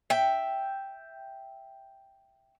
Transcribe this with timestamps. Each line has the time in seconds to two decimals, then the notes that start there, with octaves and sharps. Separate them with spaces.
0.10 E5 G5